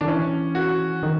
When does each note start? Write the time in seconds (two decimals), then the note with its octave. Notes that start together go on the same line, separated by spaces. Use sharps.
0.01 D#3 D4
0.08 E3 C#4
0.55 F#4
1.03 D#3